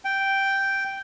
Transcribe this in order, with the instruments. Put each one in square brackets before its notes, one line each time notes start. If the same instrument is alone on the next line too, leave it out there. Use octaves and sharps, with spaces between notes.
[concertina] G5